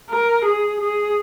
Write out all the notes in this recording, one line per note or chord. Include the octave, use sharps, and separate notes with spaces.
A#4
G#4
G#4